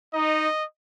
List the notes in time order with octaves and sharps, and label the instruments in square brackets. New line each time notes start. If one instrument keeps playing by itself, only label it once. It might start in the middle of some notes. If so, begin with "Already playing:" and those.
[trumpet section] D#4 [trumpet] D#5